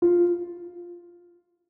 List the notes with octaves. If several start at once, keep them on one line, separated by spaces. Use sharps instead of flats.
F4